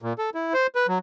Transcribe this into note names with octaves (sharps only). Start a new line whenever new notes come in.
A#2
A4
E4
C5
B4
F#3